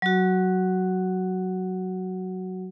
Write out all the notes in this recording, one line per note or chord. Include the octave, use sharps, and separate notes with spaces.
F#3 F#4